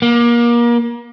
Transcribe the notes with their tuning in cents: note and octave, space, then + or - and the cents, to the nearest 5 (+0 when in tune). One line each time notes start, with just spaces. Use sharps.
A#3 +30